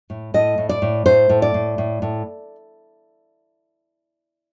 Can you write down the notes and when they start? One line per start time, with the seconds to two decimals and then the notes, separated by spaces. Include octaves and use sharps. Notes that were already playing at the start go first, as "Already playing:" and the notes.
0.10 A2
0.34 A2 D#5
0.58 A2
0.69 D5
0.82 A2
1.06 A2 C5
1.29 A2
1.42 D5
1.54 A2
1.78 A2
2.02 A2